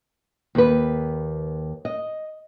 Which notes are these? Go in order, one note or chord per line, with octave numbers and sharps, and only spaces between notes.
D#2 B4
D#5